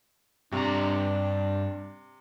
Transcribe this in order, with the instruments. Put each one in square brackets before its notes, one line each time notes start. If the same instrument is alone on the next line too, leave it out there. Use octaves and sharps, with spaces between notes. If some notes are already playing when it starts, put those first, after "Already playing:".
[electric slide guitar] G2 A#5 [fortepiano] C3 [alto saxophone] D4